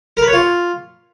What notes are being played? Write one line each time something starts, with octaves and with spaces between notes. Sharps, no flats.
A#4
B4
C#5
F4